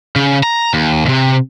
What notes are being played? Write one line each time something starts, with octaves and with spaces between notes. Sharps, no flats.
C#3
A#5
D#2
D#2 C3